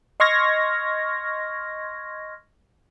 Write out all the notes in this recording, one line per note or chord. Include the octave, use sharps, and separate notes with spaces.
D#5 C6 C#6 F6 G#6 A#6